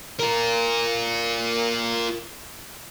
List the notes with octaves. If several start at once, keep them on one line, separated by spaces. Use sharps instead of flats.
F4 A#4